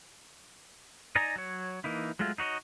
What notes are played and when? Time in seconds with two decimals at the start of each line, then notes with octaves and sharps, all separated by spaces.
1.16 D#4 D5 D#5 G#5 A#5
1.36 F#3 C#5
1.84 E3 A#3 D#4 E4
2.19 F#3 G#3 A3 F4
2.38 D#4 F#4 C#5 D#5